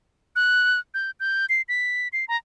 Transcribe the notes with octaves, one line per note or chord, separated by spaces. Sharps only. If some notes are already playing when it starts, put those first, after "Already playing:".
F#6
G6
G6
C7
B6
C7
A#5